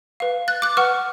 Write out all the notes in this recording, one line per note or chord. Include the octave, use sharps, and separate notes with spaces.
B4 F5
F#6 A6
D6 F#6
B4 F#5 C#6 F6